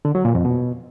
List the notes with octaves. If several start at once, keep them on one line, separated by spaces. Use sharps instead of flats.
D3
F#3
A#2
F2
B2